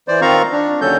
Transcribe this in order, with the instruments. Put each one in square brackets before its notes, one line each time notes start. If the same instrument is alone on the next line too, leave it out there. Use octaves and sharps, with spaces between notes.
[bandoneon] E3 C5 D5
D#3 C4 F4 F5 A#5 C#6
D4
D#2 D3 F#3 C#4 A4 G6